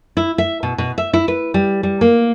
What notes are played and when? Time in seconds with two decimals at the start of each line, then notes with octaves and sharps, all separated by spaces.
0.17 E4
0.38 E5
0.63 B2
0.78 B2
0.98 E5
1.13 E4
1.28 B4
1.54 G3
1.83 G3
2.01 A#3